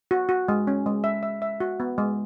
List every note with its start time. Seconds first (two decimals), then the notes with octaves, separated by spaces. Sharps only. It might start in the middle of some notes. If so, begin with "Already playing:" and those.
0.11 F#4
0.29 F#4
0.48 G#3
0.67 C#4
0.86 G#3
1.04 E5
1.23 E5
1.42 E5
1.60 F#4
1.80 B3
1.98 G#3